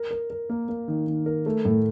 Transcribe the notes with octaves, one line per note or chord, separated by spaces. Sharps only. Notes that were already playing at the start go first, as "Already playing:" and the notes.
Already playing: A#4
A#4
A#4
A#3
A#3
D#3
D#3
A#4
A3
A2